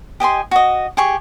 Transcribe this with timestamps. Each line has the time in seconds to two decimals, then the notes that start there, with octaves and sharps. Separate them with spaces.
0.20 G4 D#5 G#5 C6
0.51 F#4 D#5
0.97 G4 G#4 C#6